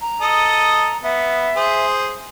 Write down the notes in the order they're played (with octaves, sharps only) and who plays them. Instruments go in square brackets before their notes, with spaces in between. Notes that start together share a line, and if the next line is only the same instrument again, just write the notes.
[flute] A#5
[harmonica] A4 D#5 D#6
[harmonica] B3 [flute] E5
[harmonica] G#4 C5